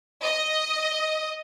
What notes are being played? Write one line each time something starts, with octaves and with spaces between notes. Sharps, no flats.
D#5